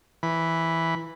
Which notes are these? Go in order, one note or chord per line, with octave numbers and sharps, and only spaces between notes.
E3 B5